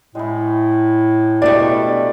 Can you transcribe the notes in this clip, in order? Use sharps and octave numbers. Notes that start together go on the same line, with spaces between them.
A2 G#3 E4
B2 G3 A3 D4 E4 C5 D5